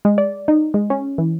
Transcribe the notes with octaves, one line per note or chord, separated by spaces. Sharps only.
G#3
D5
D#4
G#3
C#4
E3